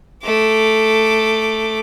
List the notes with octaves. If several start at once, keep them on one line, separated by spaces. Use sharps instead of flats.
A3 D6